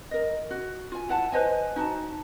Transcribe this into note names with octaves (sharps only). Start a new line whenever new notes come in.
A#4 D#5
F#4
F4 G#5
E4 F#5 A5
B4 C5 D#5 G#5
D#4 F#4 A5